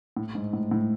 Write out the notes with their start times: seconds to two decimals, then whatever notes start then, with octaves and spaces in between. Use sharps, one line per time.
0.17 A2
0.35 G#2
0.53 A2
0.71 A2